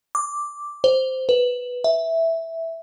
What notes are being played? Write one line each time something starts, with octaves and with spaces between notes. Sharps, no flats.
D6
C5
B4
E5